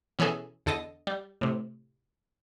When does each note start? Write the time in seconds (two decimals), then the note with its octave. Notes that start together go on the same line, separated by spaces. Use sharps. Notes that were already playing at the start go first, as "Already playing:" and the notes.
0.19 B2 E3 C#4 G#4 A4
0.66 E2 D3 A4 D#5
1.07 G3
1.41 A2 C3